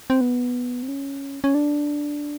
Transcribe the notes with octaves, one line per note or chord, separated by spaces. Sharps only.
C4
B3
C4
C#4
C#4
D4